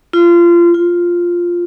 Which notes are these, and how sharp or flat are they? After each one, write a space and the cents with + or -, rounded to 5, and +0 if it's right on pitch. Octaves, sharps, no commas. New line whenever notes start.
F4 -25
F4 +0